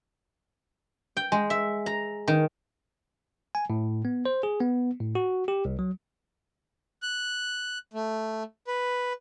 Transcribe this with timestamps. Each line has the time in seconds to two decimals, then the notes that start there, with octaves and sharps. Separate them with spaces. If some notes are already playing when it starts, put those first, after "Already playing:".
1.17 G5
1.32 G#3
1.50 E5
1.86 A#5
2.28 D#3
3.55 G#5
3.70 A2
4.05 B3
4.25 C5
4.43 G#4
4.60 B3
5.00 A2
5.15 F#4
5.48 G4
5.65 C2
5.79 F#3
7.02 F#6
7.94 A3
8.67 B4